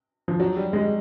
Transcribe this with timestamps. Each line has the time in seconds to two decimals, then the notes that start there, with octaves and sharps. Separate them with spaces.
0.28 F3
0.40 F#3
0.57 G3
0.73 G#3